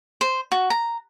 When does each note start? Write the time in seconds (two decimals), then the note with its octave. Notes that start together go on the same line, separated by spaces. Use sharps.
0.21 C5
0.52 F#4
0.70 A#5